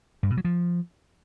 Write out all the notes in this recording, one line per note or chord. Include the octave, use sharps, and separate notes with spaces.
G2
B2
F#3
F3